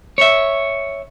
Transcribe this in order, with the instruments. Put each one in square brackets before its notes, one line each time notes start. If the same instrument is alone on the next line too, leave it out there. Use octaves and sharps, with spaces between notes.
[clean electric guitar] C#5 E5